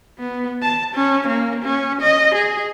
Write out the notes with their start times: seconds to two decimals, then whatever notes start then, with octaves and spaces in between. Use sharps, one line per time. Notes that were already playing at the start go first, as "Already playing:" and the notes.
0.19 B3
0.62 A5
0.95 C#4
1.28 A#3
1.63 C#4
2.02 D#5
2.35 G#4